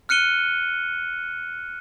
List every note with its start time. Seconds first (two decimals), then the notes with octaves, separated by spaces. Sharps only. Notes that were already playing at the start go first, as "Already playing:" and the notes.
0.09 F6 F#6 C#7 D#7 G7